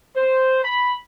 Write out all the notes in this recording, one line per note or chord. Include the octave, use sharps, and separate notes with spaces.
C5
B5